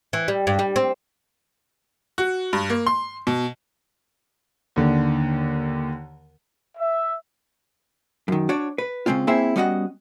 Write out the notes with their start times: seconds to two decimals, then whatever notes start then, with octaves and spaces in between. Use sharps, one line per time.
0.13 E3
0.28 G3
0.47 G2
0.59 G3
0.76 C4
2.18 F#4
2.53 G2
2.70 A#3
2.86 C6
3.27 B2
4.76 D#2 D3
6.78 E5
8.28 F#2 D#3
8.49 D4 F#4 C#5 D5
8.78 B4
9.06 C#3 G#3 C4 C#4 F4
9.27 A#3 C4 E4 G#4 C5 E5
9.56 G3 B3 C#4 F#4 D#5 F#5